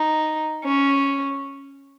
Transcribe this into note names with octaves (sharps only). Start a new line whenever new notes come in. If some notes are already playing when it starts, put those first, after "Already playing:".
Already playing: D#4
C#4